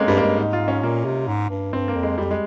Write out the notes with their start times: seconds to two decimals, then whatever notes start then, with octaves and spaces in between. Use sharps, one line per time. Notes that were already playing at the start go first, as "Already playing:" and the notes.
Already playing: G#3 A#3 C4 C#4
0.08 G2 G3
0.17 A#3
0.22 G2 G#3
0.37 G#2 D#4
0.53 F4
0.68 C#4
0.82 A#2 A#3
1.05 C3
1.28 G#2
1.50 G2
1.73 G2 C4
1.88 A#3
1.95 F2
2.03 G#3
2.18 F2 G3
2.31 G#3